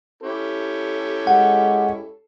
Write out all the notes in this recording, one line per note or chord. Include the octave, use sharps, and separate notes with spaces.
C#4 E4 G4 A4
G#3 F#5